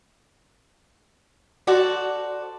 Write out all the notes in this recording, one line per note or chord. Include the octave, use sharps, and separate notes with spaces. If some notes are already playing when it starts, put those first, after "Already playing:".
F#4 A4 C5 D5